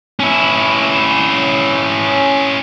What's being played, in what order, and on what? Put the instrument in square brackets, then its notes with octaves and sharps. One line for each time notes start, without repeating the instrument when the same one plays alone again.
[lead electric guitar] C#4 E4